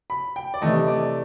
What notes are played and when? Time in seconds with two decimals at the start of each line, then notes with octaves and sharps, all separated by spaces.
0.10 B5
0.36 G5
0.54 D5
0.62 C3 E3 A3 D#5
0.88 D5